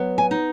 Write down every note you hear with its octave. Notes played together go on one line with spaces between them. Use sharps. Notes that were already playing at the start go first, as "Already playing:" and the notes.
Already playing: F#3 B3
G#5
D#4